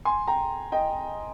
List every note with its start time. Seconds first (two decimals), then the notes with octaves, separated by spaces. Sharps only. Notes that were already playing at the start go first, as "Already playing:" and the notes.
0.05 G#5 C6
0.27 G5 A#5
0.72 D#5 G5